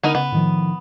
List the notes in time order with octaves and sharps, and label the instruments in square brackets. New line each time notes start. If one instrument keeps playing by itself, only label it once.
[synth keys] D3 D#6 D#7 [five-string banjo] B3 D#4 A#4
[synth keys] C#3 [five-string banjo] B3
[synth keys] A2 D#3 F3